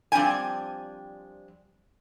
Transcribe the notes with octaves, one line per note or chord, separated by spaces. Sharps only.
F3 G3 C4 D4 G5 G#5